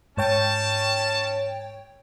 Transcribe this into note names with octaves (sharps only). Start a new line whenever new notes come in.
G#2 C#4 C#5 G5 A5